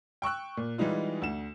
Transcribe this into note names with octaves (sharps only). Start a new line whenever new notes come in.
G5 C#6 E6 F#6
A#2
E3 G3 G#3 D#4 F4
D2 E7